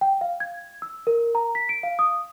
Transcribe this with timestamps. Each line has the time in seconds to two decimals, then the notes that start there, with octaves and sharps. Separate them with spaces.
0.01 G5
0.21 F5
0.40 G#6
0.82 E6
1.07 A#4
1.35 A#5
1.55 B6
1.69 D7
1.83 F5
1.99 D#6